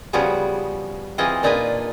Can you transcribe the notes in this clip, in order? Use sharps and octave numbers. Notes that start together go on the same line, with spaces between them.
C#3 F3 G3 B3 F#4 G#4
E3 C4 F4 G#4 D#5
A#2 D4 D#4 G#4 B4 G#5